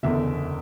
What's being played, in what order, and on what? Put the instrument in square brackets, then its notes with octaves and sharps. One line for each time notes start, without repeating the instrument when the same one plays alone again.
[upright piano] F#1 E2 D3 E5